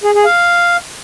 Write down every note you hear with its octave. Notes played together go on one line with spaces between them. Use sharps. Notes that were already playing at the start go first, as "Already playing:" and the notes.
G#4
G#4
F5